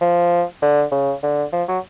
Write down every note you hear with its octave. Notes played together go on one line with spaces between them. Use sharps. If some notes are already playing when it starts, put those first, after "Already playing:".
F3
D3
C#3
D3
F3
F#3